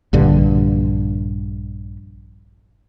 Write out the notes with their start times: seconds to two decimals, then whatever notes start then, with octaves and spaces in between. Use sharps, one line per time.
0.13 A#1 G2 D3